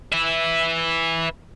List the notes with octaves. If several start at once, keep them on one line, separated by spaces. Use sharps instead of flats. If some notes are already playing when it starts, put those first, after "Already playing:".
B4 E5